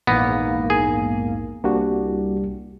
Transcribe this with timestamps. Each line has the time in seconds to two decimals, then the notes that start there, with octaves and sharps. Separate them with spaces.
0.07 A#1 E2 G#2 A#3 B3 A#6
0.70 G#4
1.64 C2 A#3 D4 F#4 G4